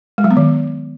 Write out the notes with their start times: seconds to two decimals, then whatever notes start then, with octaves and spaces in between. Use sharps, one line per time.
0.18 G#3
0.24 F#3
0.31 B3
0.37 D#3